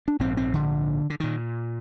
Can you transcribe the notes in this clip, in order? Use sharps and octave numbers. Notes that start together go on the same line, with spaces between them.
D4
A#1 G#2 C4
C4
D3
D3
A#2 D#3